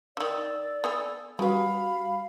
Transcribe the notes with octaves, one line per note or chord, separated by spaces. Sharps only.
D3 D#3 D5 E6
B3 A4 G#5
C#3 G3 F#4 B4 F5 B5